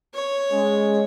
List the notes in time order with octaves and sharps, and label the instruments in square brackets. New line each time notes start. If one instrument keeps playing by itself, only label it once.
[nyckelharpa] C#5
[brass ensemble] G#3 C#4